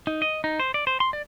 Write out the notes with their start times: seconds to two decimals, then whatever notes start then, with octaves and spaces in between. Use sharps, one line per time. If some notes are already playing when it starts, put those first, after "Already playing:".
0.07 D#4
0.22 D#5
0.44 D#4
0.60 C5
0.74 D5
0.87 C5
1.00 C6
1.13 D5